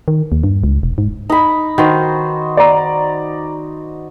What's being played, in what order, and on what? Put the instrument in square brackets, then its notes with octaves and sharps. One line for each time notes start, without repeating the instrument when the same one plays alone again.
[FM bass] D#3
D#2
G2
C#2
E1
G#2
[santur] D#4 B5
[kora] D#3 [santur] F#4 C5
[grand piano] D5 A#5